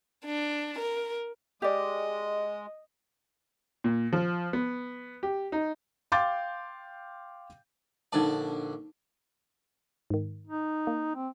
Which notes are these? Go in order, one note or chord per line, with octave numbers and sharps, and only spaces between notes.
D4
A#4
G#3 G4 D5 D#5
A#2
F3
B3
G4
D#4
F5 G5 C6 D6 G6 A6
A#1 D3 D#4 D5 A5
G#2 D#3
D#4
A#3
C4